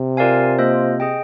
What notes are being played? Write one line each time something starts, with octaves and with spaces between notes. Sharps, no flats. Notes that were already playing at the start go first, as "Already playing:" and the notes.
Already playing: C3
F4 A#4 D5 F5 G#5
A#3 F4 C5 D#5
G#4 D#5 G5